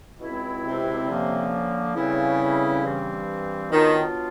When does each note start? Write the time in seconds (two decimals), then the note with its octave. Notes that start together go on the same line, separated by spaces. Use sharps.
0.20 C#2 B2 G#3 C4 E4
0.65 C3
1.08 D3 F3 A#3 C#4
1.95 A2 C#3 E3 G3 C4 E4
2.83 G2 E3 G3 C4
3.71 B2 D#3 F#3 B3 D4 F4